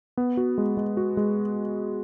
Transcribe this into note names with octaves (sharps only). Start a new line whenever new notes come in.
B3
F#4
G#3
G#3
F#4
G#3